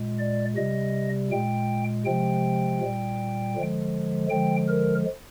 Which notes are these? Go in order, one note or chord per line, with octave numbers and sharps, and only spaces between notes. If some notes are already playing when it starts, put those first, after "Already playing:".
Already playing: A#2 G#3
D5
C3 G3 D#5
A#2 G#3 G5
C3 F3 G#3 G5
A#2 G3
D3 F3 G#3
D3 F3 G#3 G5
A#4